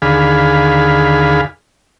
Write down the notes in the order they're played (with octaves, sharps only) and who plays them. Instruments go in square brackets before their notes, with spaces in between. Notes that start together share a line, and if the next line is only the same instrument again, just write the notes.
[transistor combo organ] D#2 D3 G#4 F5 B5